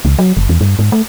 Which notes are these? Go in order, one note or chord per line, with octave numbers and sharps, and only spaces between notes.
C#2
F#3
F#1
E2
G2
G#2
A3